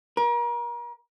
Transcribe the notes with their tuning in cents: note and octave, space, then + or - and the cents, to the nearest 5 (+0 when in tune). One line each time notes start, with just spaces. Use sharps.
A#4 +35